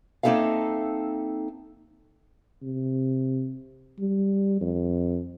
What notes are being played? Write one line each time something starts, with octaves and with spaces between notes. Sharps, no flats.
A#3 C4 D#4 A4 E5 F5
C3
G3
F2